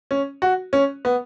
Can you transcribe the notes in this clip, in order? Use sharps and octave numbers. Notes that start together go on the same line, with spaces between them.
C#4
F#4
C#4
B3